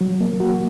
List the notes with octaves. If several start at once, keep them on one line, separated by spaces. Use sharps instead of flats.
F#3
A#3
F#4